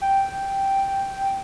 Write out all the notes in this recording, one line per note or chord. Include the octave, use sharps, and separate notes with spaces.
G5